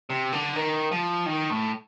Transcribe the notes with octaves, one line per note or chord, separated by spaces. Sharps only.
C3
D3
D#3
F3
D#3
A2